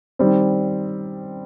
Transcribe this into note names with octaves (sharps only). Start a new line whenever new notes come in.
D#3 G3 C4